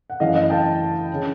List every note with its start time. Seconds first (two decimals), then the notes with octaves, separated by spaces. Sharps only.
0.10 F#5
0.20 F#2 C#3 E3 A3 D#5 F5
0.35 D#5 F5
0.50 G5 A5
1.13 C#3